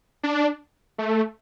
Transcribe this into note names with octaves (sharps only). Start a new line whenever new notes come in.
D4
A3